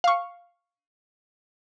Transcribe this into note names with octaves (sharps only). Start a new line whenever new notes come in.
F5 C#6